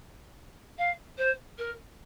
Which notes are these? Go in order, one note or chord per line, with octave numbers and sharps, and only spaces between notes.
F5
C5
A#4